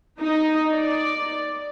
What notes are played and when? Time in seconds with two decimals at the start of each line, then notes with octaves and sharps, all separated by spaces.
0.19 D#4
0.72 D5